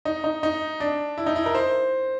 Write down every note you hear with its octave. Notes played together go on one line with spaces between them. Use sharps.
D#4
D#4
D#4
D4
E4
D#4
E4
A#4
C5